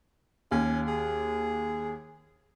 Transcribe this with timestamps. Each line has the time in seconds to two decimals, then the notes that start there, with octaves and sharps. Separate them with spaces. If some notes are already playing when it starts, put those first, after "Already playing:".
0.51 D#2 C#4
0.88 G#4